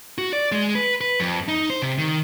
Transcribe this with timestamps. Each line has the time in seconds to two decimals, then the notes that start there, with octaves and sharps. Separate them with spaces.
0.18 F#4
0.33 D5
0.52 G#3
0.75 B4
1.01 B4
1.20 F2
1.48 D#4
1.70 C5
1.82 C3
1.98 D#3